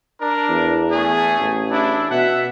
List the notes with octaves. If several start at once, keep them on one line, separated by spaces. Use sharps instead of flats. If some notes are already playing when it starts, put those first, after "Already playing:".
D4 A#4
E2
A3 G#4
A1
D4 E4
B2 E5 F#5